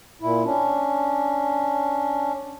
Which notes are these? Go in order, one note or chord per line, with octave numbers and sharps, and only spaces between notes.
A#2 E4
C#4 D4